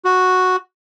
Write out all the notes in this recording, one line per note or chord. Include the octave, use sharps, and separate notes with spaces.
F#4